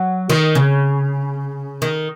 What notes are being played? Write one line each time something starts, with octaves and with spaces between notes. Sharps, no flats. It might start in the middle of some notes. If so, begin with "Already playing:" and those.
Already playing: F#3
D#3
C#3
D#3